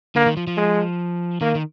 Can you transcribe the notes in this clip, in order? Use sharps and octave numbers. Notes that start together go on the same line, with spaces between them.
D3 A#3
D#3
F3
F3
G#3
D#3 A#3
D#3